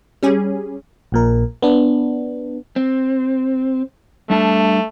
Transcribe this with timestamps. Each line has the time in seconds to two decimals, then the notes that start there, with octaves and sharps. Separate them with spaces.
0.23 G3 C#4 G#4
1.12 A#1 A#2 A#4
1.62 B3 D4
2.76 C4
4.30 G3 A3 D4 A5